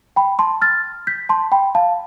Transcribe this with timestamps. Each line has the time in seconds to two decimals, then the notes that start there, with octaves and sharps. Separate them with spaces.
0.16 G5 B5
0.39 A5 C6
0.62 F6 A6
1.07 G6 B6
1.29 A5 C6
1.52 G5 B5
1.75 F5 A5